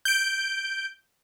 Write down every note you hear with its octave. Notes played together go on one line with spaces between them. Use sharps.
G6 D7